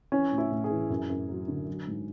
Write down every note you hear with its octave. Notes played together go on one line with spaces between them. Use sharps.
E3 C#4
A2
E4
A2
G#4
E3
F#2
F#2
F#3
D3
F#3
G#2